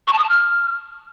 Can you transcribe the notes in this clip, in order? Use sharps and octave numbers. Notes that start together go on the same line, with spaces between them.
C#6
A5
D#6
A5
F6